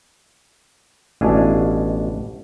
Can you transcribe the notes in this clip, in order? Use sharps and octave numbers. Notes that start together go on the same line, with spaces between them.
A1 B2 D4 E5 F5 G#5